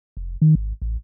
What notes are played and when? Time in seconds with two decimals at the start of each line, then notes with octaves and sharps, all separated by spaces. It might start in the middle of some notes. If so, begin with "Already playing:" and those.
0.17 F1
0.42 D#3
0.55 G#1
0.82 A1